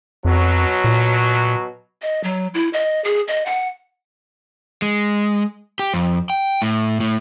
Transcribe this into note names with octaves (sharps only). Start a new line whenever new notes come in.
F2 B2 F#3
A#2
D#5
F#3
E4
D#5
G#4
D#5
F#5
G#3
G4
F2
G5
A2
A2